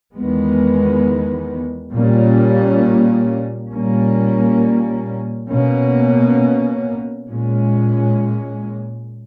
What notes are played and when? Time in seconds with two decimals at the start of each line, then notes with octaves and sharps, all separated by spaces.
0.15 E2 D#3 G#3 B3
1.93 A#2 G3 A#3 C#4
3.71 A#2 G3 A#3 C#4
5.50 B2 A#3 C#4
7.28 A#2 G#3 C#4